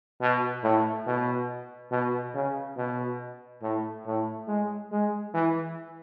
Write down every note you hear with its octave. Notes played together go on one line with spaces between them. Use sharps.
B2
A2
B2
B2
C#3
B2
A2
A2
G#3
G#3
E3